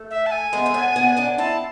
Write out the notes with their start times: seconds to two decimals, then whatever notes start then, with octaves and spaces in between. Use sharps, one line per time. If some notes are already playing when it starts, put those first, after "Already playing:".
Already playing: A3
0.11 E5
0.26 A5
0.32 G#5
0.53 G#3 B3
0.66 C4
0.74 B3 D4
0.96 B3 D4
1.17 B3 D4
1.38 C4 E4 A5